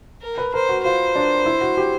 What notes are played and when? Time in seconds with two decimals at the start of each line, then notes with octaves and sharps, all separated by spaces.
0.22 A#4
0.38 B4
0.54 A#4 C5
0.69 F#4
0.84 F4 C5
1.16 D4
1.46 E4
1.61 F#4
1.77 G4